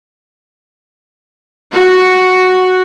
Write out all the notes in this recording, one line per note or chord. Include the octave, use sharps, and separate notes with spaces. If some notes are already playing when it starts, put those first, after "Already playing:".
F#4